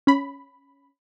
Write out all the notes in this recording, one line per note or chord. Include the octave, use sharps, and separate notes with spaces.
C#4 B5